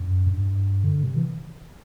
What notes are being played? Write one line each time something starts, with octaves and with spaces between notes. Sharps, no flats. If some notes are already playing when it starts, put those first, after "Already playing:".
Already playing: F#2
G2
D3
C3
E3